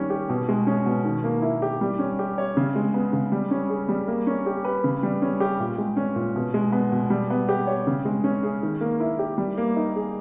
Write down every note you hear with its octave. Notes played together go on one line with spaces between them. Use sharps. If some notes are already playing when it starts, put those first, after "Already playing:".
Already playing: D#3 G3 C#4
G4
B2
G#3
C#4
B2
D#3
A#3
E4
G4
G3
C#4
G4
C#5
C#3
G#3
B3
C#3
G3
C#4
G#4
G3
A#3
C#4
G4
B4
C#3
G3
C#4
G4
A#2
G#3
C#4
A#2
B2
G#3
B3
B2
G3
B3
G4
C#5
C#3
G#3
C#4
G#4
D#3
A#3
E4
G4
G3
A#3
D#4
G#4